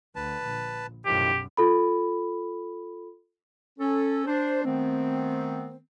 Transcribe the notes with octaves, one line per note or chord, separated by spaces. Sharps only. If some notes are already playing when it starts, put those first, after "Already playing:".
D2 D3 B4 A5
A#1
B1 F#2 A2 D#3 F3 G4
F4 A4 B5
C#4 A4
D4 C5
D#3 A3 B3 C4